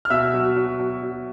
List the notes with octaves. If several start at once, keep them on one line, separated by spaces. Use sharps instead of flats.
F6
B2 E5 E6
F#3
F#3
F#3
F#3